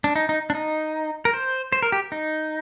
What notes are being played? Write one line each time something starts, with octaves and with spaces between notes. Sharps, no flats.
D4
D#4
D#4
D4
D#4
A#4
C5
C5
A#4
G4
D#4